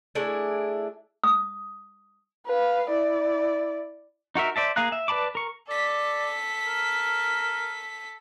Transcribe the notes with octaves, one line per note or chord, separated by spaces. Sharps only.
A3 D4 E4 G#4
D#6
B4 F5
E4 D5
D#4 F#4 A#4 E5
C5 D5 E5 A5
A#3 G#4 F5 A#5 F#6
E5
B4 D5 A5 B5 D6
A#4 C#6
A4 D5 B6
A#4